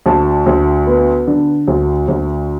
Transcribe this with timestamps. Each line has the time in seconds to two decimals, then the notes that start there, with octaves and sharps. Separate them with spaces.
0.06 D2 A5
0.46 D2
0.87 B3
1.27 D3
1.68 D2
2.08 D2